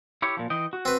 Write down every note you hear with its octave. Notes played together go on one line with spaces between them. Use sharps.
E4 G4 C#5
A#2 F3
E3 D#5 G5
F#4
C4 B4